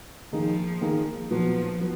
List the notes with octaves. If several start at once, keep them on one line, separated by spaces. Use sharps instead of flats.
D#3 F3 A#3 D#4 G#4
D#3 A#3 D#4 G#4
A#2 F3 F#3 B3
F#3 B3